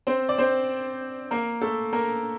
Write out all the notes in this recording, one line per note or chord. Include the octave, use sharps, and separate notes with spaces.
C4 C5
D5
C4 C5
A#3 A#4
A3 A4
A#3 A#4